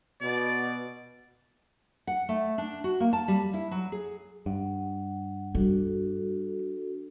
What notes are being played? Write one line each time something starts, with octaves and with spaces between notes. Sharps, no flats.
B2 D5
F#5
A3
D4
F#4
A#3
A5
G3
E4
F#3
G#4
G2 F#5
G3 D4 F#4 A4